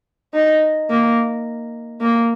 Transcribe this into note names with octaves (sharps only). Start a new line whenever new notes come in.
D#4
A#3
A#3